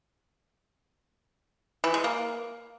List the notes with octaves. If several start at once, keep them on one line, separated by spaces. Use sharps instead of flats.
E3
G#3
A#3